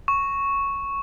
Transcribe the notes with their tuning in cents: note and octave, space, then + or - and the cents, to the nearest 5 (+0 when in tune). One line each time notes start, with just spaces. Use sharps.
C#6 +0